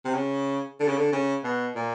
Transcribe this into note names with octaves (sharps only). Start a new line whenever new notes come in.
C3
C#3
D3
C#3
D3
C#3
B2
A#2